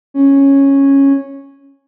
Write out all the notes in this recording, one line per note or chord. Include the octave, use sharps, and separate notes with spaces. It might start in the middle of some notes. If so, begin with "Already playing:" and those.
C#4